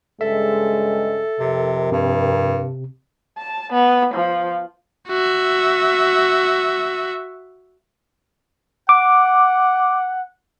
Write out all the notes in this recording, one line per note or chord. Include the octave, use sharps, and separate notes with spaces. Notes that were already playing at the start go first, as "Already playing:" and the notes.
G2 C#3 G#3 A4 E5
F2 C3 A#4
G2 C3
A5
B3
F3
F#4 E5
F#5 D6